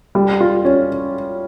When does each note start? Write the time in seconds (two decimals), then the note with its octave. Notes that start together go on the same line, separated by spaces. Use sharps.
0.15 G3
0.41 F4
0.65 C#4